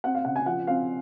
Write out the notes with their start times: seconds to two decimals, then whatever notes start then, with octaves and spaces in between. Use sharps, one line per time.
0.04 C4 F#5
0.15 F5
0.25 C#3 F#5
0.36 G#5
0.46 F3 F#5
0.67 C4 F5